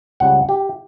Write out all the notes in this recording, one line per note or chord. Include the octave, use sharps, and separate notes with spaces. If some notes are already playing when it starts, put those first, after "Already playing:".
C#2 C#3 G3 F#5
G4